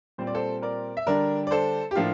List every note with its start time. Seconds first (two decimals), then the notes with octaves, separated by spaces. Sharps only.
0.18 A#2 G3 C4 C5
0.27 D5
0.35 A4 C5
0.62 A#4 D5
0.97 E5
1.07 D3 G3 D4 A#4 D5
1.47 D5
1.51 A4 C5
1.91 G4
1.95 A2 F3 A#3 D4 F4